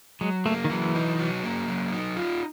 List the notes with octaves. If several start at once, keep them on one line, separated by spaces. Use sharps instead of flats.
F#3 G#3
A3 A#3
D#3
E3 F#3
D#4
F#3
A#3
F#3
D#4
F4